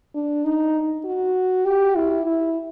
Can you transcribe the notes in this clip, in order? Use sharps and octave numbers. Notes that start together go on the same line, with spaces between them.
D4
D#4
F#4
G4
E4
E4